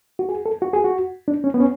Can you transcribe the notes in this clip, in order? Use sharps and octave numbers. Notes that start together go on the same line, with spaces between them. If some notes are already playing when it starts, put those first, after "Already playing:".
F#4
G#4
A4
F#4
G#4
F#4
D4
C#4
B3
C#4